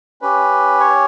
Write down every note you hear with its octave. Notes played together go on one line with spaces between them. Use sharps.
C#4 G4 B4
C#5